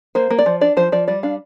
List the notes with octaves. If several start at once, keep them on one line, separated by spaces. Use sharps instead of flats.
A#3 C5
A#3
D5
F3
D4 D5
F3 C5
F3 D5
G3 D5
D4 F5